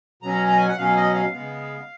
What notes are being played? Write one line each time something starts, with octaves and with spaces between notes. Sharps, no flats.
B2 F#3 C#4 A#5
A#5
G#5
F#5
B2 F#3 C#4 F5
D#5
F5
C#3 G#3 B3 F5